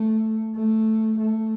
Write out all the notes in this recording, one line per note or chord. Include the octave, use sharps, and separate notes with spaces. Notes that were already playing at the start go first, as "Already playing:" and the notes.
Already playing: A3
A3
A3